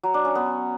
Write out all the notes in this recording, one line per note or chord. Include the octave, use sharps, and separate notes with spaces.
F#3
D4
C#4
B3